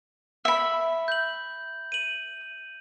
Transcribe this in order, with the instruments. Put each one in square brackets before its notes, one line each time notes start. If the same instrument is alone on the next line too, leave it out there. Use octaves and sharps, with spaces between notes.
[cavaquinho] E5 B5
[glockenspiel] G6 F#7
D#7 F#7